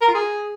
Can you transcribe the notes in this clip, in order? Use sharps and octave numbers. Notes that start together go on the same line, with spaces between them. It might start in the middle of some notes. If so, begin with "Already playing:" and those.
A#4
F4
G#4